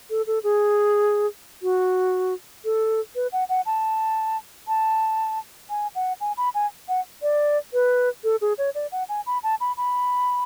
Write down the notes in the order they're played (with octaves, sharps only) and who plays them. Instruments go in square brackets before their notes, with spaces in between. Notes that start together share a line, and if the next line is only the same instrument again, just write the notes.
[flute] A4
A4
G#4
F#4
A4
B4
F#5
F#5
A5
A5
G#5
F#5
G#5
B5
G#5
F#5
D5
B4
A4
G#4
C#5
D5
F#5
G#5
B5
A5
B5
B5